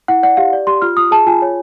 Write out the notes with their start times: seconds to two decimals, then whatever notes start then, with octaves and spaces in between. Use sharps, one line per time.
0.08 E4 F#5
0.23 D5 F#5
0.37 G4 F5
0.53 D5
0.67 G4 C6
0.82 F4 F6
0.97 F4 D#6
1.11 G#4 A5
1.27 F4 G#5
1.42 C#5